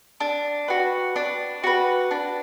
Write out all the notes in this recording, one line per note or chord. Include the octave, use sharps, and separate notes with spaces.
D4
F#4 B4
D4
F#4 B4
D4